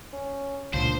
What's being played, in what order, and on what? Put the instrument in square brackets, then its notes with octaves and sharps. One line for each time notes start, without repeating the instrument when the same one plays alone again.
[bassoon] C#4
[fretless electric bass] C#2 A#2 D3 [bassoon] F3 [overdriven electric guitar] C5